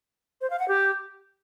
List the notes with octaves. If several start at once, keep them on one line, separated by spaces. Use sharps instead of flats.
C5
F5
F#5
G4